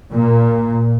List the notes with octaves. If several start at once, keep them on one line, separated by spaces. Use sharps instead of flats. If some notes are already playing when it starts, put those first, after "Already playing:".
A#2